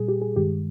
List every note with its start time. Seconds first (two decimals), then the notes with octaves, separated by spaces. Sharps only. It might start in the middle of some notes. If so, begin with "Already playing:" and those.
Already playing: A#2 G3 G#4
0.08 G4
0.22 G#4
0.36 G2 D#3 G#3 G4